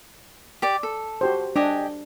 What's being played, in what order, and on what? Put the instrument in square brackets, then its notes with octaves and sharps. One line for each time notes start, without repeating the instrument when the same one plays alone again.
[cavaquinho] G4 D5
A4
[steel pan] F#4 G4 C5
[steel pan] D4 [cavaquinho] G4 D#5 G#5